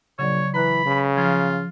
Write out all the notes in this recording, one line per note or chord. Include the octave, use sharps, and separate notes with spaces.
A#1 C#3 F#3 C#5 D5
E3 B4 A#5 B5 F#6
C#3
F3 F4